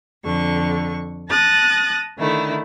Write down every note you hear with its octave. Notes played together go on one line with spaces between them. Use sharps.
F2 D3 C#6
A5 D#6 F#6 A6 A#6
D3 D#3 A3 E4